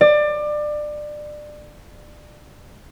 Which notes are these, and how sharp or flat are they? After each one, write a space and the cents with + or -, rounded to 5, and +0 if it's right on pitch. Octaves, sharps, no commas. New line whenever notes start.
D5 +25